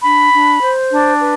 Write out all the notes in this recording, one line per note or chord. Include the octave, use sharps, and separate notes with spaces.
D4 B5
D4
C5
D4
B4